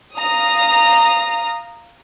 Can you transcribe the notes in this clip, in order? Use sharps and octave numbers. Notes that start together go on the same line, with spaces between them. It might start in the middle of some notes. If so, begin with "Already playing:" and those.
F5 A#5 D#6